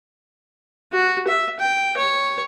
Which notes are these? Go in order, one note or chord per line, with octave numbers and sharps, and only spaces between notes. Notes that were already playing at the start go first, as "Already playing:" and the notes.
F#4
E5
G5
C#5